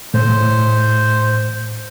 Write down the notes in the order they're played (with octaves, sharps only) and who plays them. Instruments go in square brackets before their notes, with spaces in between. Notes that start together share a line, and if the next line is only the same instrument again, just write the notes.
[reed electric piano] A2 [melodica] C5